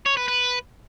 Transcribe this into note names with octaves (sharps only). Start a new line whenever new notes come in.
C#5
B4
B4